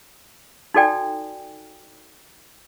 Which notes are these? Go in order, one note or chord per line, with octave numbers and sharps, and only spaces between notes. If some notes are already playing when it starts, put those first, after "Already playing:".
D#4 F#4 A4 D5 G5 G#5